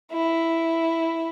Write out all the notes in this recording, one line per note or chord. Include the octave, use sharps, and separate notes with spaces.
E4